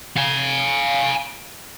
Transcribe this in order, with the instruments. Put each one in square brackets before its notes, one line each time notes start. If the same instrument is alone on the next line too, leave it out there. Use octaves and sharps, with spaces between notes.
[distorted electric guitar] F5 G#5